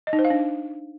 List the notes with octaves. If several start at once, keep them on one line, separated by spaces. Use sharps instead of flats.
D#5
D#4
C5
F5
D4